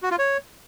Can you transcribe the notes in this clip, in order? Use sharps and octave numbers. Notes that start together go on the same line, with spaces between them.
F#4
F4
C#5